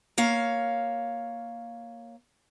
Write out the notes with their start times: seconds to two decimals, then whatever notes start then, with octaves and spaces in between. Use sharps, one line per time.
0.18 A#3 C#5 F5